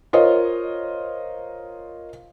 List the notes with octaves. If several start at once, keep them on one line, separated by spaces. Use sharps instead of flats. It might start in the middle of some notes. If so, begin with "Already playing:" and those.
F4 A#4 C5 C#5 D#5